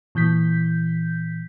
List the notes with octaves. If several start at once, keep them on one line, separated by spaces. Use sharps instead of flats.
A#2 E3 G6 B6